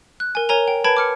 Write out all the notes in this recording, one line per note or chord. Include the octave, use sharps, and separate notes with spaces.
F#6
A#4 G#5
A#4 C#5 G#5 A#5 F7
G5
B4 A5 B5 G#6 D7
D6 F6 C#7